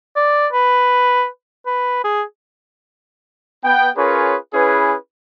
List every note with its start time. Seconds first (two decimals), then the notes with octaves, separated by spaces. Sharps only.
0.16 D5
0.53 B4
1.66 B4
2.04 G#4
3.64 B3 G5
3.97 C#4 F4 G#4 A#4 B4 C#5
4.54 C#4 E4 G#4 B4